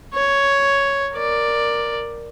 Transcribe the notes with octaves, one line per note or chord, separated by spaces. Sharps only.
C#5
A#4 D5